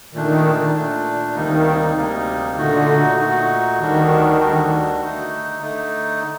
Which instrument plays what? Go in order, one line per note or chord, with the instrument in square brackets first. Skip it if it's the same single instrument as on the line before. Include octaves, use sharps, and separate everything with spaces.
[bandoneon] A#2 A3 D4 [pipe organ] D#3
[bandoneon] A#2 A3 D4
[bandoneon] D2 C3 G3 A#3 D#4 [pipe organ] D#3
[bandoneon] D2 C3 G3 A#3 D#4
[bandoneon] A#2 A3 D#4 F#4 [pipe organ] D3
[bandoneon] A#2 A3 D#4 F#4
[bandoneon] D2 D3 G3 D4 F#4 [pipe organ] D#3
[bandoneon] D2 D3 G3 D4 F#4
D3 A3 D#4
D3 A3 D#4